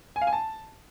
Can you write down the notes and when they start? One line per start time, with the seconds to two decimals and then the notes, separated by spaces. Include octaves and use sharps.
0.16 G#5
0.21 F5
0.27 G#5
0.33 A5